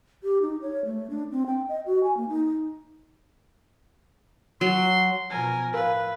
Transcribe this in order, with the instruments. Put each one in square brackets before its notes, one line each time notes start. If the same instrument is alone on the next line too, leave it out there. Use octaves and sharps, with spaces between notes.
[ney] G4
D#4
C#5
A3
D4
C4
G5
D#5
F#4
G#5
A#3
D#4
[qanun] F#3 [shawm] C6
[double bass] B2 F3 [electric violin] A#4 G#5
[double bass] A2 [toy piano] A#4 [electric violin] B4 [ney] F5